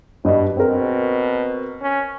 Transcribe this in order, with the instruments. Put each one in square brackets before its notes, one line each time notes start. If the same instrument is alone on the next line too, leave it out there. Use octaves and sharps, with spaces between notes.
[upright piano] G2 D#5 [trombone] B2
[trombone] B2 [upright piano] C4 A#4
[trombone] C#4